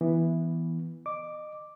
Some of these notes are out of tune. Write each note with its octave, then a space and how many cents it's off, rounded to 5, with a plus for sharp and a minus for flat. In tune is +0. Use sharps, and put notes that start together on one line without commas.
E3 +0 B3 -10
D#5 -30 D6 +0